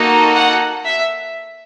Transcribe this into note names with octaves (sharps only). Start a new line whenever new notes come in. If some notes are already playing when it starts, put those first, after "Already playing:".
Already playing: A#3 D#4 F#4 A4
F#5
E5